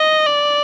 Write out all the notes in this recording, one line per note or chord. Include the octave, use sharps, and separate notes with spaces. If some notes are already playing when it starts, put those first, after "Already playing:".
Already playing: D#5
D5